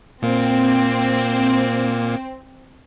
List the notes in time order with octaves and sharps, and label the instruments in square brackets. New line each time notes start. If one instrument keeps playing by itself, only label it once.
[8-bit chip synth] A#2 A#3 [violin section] C4